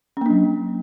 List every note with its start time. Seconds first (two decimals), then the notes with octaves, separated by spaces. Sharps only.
0.17 C#4
0.21 A#3
0.26 D4
0.30 F#3